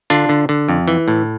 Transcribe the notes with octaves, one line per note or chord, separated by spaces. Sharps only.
D3 D4 F4
D3
D3
F2
E3
A2